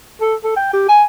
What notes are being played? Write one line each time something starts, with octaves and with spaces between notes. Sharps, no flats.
A4
A4
G5
G4
G#5